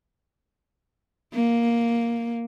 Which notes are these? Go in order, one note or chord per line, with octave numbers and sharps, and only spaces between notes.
A#3